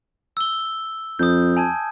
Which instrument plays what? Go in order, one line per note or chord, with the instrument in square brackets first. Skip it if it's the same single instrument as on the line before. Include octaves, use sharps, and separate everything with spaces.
[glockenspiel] E6 G7
[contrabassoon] F2 [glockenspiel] D#6 G6
[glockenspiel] G#5 A5 G#6